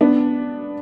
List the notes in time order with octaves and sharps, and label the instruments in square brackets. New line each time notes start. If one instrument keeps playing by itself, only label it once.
[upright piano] B3 D4